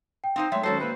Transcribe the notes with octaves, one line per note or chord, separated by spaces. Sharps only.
G5
C4 D#4 C5 F5
F#3 G#3 A3 E5
D#3 F#3 G#3 C#4 F#4 A4 C5 C7
A#3 A4 B4